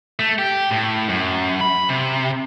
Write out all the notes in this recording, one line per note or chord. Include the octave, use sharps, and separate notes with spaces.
A3
G4
A2
F#2
B5
C3